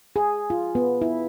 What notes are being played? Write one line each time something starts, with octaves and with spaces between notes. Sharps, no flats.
G#4
F4
B3
E4